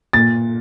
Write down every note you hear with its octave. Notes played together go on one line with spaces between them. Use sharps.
A#2 A6